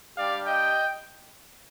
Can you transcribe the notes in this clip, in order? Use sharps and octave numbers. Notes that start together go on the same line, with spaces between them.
G3 D4 G4 D5 F5
D#5 G5